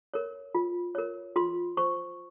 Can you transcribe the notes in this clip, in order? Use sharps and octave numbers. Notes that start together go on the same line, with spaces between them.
A#4 C#5
F4
A#4 C#5
F4 C6
C5 C#6